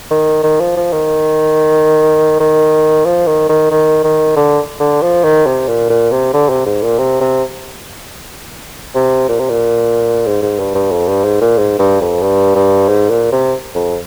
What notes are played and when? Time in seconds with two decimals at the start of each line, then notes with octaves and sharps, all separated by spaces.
0.11 D#3
0.43 D#3
0.60 F3
0.77 F3
0.93 D#3
2.40 D#3
3.06 F3
3.27 D#3
3.49 D#3
3.71 D#3
4.04 D#3
4.36 D3
4.80 D3
5.02 F3
5.24 D#3
5.46 C3
5.68 A#2
5.90 A#2
6.12 C3
6.33 D3
6.49 C3
6.66 G#2
6.83 A#2
6.98 C3
7.21 C3
8.95 C3
9.29 A#2
9.39 C3
9.50 A#2
10.26 G#2
10.42 G#2
10.59 G2
10.75 G2
10.91 F2
11.08 G2
11.24 G#2
11.41 A#2
11.58 G#2
11.79 G2
12.01 F2
12.22 G2
12.55 G2
12.88 G#2
13.10 A#2
13.32 C3
13.75 F2